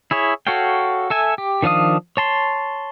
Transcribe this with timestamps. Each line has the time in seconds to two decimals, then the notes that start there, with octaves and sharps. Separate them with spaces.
0.11 E4 G#4 C#5 E5
0.47 F#4 A4 C#5 F5 G5
1.10 A4 E5 G#5
1.38 G4
1.63 D#3 F3 D4 F5 D#6
2.17 C#5 A5 C6